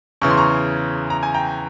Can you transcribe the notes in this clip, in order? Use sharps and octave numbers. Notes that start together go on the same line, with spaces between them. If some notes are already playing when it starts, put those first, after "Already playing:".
E2 C#3 E3 C#6
C6
A#5 C#6
A#5
G#5
G5 A#5